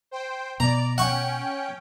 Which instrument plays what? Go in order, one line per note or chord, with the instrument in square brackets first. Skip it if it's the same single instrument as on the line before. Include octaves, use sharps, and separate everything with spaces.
[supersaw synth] C5 G5
[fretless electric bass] B2 [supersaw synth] D5 [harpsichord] A#5
[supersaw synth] C#4 G5 [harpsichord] F#5 C#6